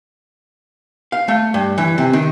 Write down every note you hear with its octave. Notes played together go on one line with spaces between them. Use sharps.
F5
A3
G2
E3
C3
D#3